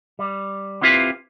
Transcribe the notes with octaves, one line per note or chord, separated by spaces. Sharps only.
G3
B3 C4 E4 F4 G4 B4